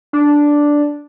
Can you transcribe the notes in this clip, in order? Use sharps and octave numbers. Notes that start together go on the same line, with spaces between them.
D4